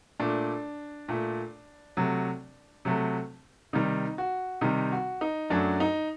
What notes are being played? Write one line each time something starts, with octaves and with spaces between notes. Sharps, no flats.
A#2 A3 D4
A#2 A3
C3 F#3 A3
C3 F#3 A3
C3 D#3 G3 D#4
F#4
C3 D#3 G3 D#4
F#4
D#4
F#2 F#3 A3 D4
D#4